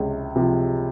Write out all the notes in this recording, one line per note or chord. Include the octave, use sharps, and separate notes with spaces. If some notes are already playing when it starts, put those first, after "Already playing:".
Already playing: C#2 C3
C3 F3